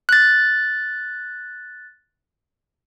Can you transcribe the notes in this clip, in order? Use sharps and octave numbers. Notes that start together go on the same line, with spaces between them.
F#6 A6